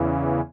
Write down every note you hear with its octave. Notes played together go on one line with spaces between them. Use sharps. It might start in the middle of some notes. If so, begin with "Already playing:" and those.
Already playing: E2 C#3 E3